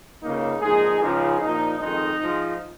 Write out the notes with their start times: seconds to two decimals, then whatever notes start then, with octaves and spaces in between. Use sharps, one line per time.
0.21 C#2 C#3 A#3 D#4
0.61 A#1 G#2 G#3 D#4 G#4
1.01 C#2 C#3 F3 G#3 D#4 G#4
1.40 A#1 A#2 F3 D#4
1.80 F2 D#3 G#3 D#4
2.19 G#2 F3 G#3